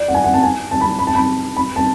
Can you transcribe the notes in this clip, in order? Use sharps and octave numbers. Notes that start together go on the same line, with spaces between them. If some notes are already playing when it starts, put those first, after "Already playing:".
Already playing: D5
F#5
G#5
F#5
A5
G#5
A5
B5
B5
A5
B5
B5
A5